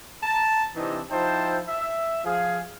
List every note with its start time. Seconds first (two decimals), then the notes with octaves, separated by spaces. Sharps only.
0.23 A5 A#5
0.76 C3 E3 C4 D4 D#4 D#5
1.10 F3 D#4 E4 C5 G5 A5
1.67 E5
2.25 F3 G#4 F5